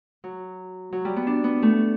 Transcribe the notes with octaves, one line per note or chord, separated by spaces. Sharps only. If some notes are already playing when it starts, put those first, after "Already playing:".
F#3
F#3
G3
B3
D4
B3
A3